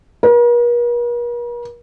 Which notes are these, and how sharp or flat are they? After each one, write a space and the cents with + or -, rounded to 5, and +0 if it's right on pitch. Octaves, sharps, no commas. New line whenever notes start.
A#4 +45